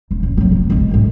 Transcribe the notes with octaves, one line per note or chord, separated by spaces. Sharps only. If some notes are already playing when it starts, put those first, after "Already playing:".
E1
A1
F#3 C4
D1
B1 G#3
A2 G#3